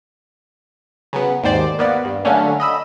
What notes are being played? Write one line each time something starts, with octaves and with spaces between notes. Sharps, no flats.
C#3 F#3 B3
G#1 D#2 G#2 D#3 C5 D5
A#3 B3 D5
G2
D3 F#3 A3 A#3 C#4 D4
D#5 B5 E6